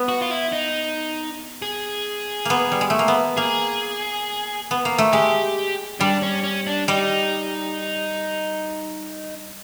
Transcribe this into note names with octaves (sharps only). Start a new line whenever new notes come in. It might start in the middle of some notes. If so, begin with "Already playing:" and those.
Already playing: B3
F#4
F4
E4
D#4
G#4
A#3 B3
G3
G#3
A3
A#3
B3
A#3 G#4
B3
A#3
A3
G#3 G4
G3 D4
C#4
C#4
D4
G3 D#4